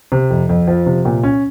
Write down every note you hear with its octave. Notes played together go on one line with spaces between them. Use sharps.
C3
F2
F2
F3
C3
A#2
C#4